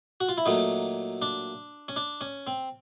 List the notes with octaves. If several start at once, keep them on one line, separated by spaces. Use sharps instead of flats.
F#4
F4
E4
A#2 F#3 A3 D#4
D4
C#4
D4
C#4
C4